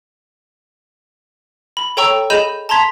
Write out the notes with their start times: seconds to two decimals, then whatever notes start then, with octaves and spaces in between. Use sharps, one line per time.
1.77 B5
1.97 A4 C#5 G5 A#5 C#6 E6
2.30 G#4 D#5 B5 G6 D#7 E7
2.69 A5 A#5 C6 G#6 B6